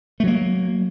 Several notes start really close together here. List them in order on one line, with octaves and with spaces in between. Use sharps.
A3 F#3 A#3